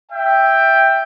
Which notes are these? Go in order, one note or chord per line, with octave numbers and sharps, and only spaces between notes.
E5 G5